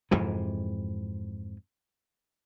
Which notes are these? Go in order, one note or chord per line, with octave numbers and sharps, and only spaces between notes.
F2 G#2 C3 E3